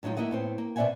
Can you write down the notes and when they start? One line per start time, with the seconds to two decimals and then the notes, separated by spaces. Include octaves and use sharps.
0.03 A2 F#3 G#3 D#4 F4
0.17 A3 A#3 E4 D#5 F#5
0.31 A2 B3 C4
0.58 A#3
0.76 B2 C4 D5 E5 F#5 G#5